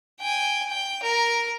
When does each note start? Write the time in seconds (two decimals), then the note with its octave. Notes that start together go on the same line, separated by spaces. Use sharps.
0.21 G5 G#5
0.68 G5
1.03 A#4